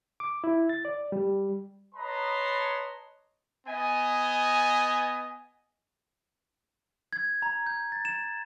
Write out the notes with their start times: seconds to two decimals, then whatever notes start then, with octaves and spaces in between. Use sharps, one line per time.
0.20 D6
0.44 E4
0.69 A6
0.85 D5
1.12 G3
1.95 B4 C#5 D#5 A5 A#5 C6
3.66 B3 D#5 G#5
7.13 G#6
7.42 A#5
7.66 G6
7.92 A6
8.05 E7